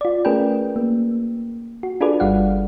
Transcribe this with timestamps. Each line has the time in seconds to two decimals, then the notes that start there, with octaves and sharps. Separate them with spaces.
0.01 F4 D5
0.25 A3 C#4 G#4 A#4 B4 G5
0.76 A#3
1.83 F#4
2.01 D4 F4 G#4 A4 B4 D5
2.20 G1 G3 F5 F#5